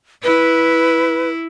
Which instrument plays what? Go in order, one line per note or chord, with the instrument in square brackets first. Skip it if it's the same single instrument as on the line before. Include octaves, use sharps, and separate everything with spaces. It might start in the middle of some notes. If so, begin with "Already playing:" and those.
[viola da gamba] E4 [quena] B4